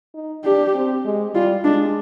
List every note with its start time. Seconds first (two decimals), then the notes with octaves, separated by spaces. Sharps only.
0.14 D#4
0.44 D4 G4
0.75 C4
1.05 G#3
1.34 G3 F4
1.64 G#3 D4